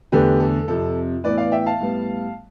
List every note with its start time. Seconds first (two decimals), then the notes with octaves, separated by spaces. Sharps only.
0.12 E2 D3 A3 G4 B4
0.40 A4
0.68 F2 C3 F3 A4
1.24 A2 E3 B3 B4 D5
1.38 D5 F5
1.52 E5 G5
1.66 F5 A5
1.80 A2 G3 B3